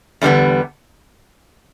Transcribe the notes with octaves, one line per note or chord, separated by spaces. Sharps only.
E2 D3 G3 B3